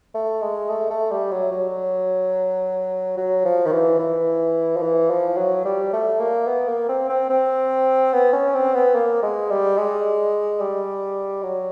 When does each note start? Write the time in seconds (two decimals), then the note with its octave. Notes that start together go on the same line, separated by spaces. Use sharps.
0.14 A3
0.42 G#3
0.69 A3
0.90 A3
1.11 G3
1.31 F#3
1.52 F#3
3.17 F#3
3.45 F3
3.66 D#3
3.72 E3
3.99 E3
4.76 F3
4.82 E3
5.10 F3
5.37 F#3
5.65 G3
5.93 A3
6.20 A#3
6.47 B3
6.68 A#3
6.89 C4
7.09 C4
7.30 C4
8.13 B3
8.33 C#4
8.54 C4
8.75 B3
8.95 A#3
9.23 G#3
9.50 G3
9.78 G#3
10.60 G3
11.43 F#3